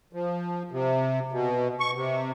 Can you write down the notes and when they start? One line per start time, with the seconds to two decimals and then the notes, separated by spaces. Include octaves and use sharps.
0.13 F3
0.71 C3
1.32 B2
1.80 C#6
1.95 C3